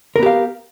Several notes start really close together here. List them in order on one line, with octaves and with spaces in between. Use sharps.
A#4 B3 G4 F5